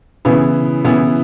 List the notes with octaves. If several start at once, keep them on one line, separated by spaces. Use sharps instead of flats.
C#3 E3 B3 E4
C#3 E3 B3 E4